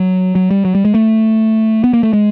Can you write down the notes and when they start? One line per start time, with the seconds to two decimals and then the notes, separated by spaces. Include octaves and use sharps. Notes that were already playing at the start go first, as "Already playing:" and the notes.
Already playing: F#3
0.35 F#3
0.51 G3
0.65 F#3
0.75 G3
0.85 G#3
0.95 A3
1.84 B3
1.93 A#3
2.03 A3
2.13 G#3